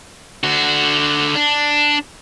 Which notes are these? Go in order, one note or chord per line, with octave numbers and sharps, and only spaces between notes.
D3 F#4
D4